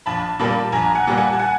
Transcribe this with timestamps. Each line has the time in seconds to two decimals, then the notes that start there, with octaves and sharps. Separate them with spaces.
0.06 A#1 A5 B5
0.39 A#2 G3 A#3 A5 B5
0.72 A#1 G#5 A#5
0.95 F#5 G#5
1.07 A#2 G3 A#3
1.17 F#5 G#5
1.33 A5
1.39 F#5 G#5